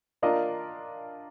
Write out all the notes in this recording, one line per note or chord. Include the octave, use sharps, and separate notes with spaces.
A#3 D4 F4 A#4 D#5